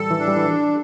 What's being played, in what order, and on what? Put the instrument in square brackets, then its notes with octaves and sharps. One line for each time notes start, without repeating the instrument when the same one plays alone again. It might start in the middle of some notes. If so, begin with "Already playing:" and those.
Already playing: [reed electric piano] A2 E3 G3 [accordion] A4
[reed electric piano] E3
[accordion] D4
[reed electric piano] G3
E3